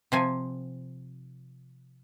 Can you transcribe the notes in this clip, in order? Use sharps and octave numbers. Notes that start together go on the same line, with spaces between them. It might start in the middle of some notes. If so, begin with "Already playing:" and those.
C3 F3 G#5